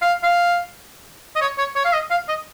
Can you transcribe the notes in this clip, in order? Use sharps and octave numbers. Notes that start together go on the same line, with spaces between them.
F5
F5
D#5
C#5
C#5
C#5
F5
D#5
F5
D#5